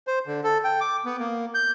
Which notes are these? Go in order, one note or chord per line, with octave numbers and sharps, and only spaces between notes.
C5
D3
A4
G5
D6
B3
A#3
G6